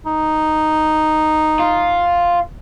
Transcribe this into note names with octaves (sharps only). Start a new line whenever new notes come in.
D#4
F4